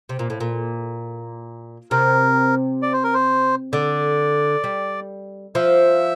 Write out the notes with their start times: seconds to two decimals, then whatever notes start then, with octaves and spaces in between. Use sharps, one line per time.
0.09 C3
0.19 A#2
0.30 A2
0.40 A#2
1.91 C3 A#4
2.82 D5
2.93 C5
3.04 A#4
3.14 C5
3.73 D3 D5
4.64 G3
5.55 F3 E5